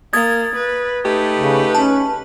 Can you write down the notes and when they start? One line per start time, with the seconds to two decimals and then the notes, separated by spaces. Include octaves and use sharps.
0.13 A#3 D#6 G#6 A6
0.56 B4
1.05 A3 D#4 G4 B4
1.38 C#3
1.75 C#4 A5